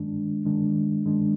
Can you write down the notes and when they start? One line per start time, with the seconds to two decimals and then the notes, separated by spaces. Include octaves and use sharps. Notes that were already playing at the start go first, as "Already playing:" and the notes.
Already playing: G2 D#3 G#3 D4
0.44 G2 D#3 G#3 D4
1.05 G2 D#3 G#3 D4